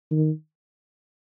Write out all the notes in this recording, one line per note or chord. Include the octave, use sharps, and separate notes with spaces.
D#3